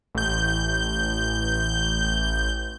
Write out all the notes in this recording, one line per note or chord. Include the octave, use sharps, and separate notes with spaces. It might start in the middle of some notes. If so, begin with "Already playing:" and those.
A1 G6